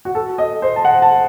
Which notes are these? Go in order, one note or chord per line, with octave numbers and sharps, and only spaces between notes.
F#4
A4
D#5
C5
A5
F#5
A5